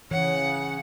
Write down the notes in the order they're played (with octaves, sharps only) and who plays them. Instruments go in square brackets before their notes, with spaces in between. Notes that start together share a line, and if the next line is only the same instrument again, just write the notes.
[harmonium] C#3 [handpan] E3 [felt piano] C#5 [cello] F#5